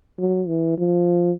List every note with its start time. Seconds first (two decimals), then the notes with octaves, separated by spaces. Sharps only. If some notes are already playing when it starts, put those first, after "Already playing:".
0.19 F#3
0.48 E3
0.78 F3